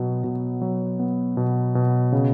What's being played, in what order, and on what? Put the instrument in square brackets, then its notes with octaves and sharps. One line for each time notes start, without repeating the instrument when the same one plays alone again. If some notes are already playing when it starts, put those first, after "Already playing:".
Already playing: [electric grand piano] B2 F#3 B3
B2
F#3
B3
B2
B2
C#3